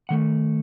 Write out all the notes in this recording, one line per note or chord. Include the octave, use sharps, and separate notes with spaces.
D#3 A3 F#5